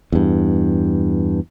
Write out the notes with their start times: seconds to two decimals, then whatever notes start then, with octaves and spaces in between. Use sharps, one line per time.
0.12 E2 G2